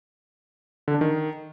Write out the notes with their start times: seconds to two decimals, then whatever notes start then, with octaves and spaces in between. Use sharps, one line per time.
0.88 D3
0.94 D4
1.01 D#3